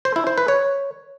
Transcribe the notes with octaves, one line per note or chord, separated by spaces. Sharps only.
C5
E4
C5
B4
C#5